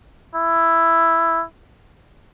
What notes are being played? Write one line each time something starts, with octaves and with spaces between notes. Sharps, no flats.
E4